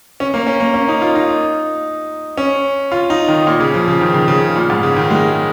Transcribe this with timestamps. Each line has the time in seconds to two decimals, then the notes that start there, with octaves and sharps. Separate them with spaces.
0.20 C#4
0.34 A#3
0.47 C#4
0.60 A#3
0.74 C#4
0.88 D#4
1.02 F4
1.15 D#4
2.38 C#4
2.92 F4
3.10 D#4
3.28 D#3
3.47 A#2
3.60 C#3
3.74 F3
3.88 C#3
4.01 D#3
4.14 C#3
4.28 C#3
4.56 A#2
4.70 G#2
4.83 C#3
4.96 D#3
5.11 G#3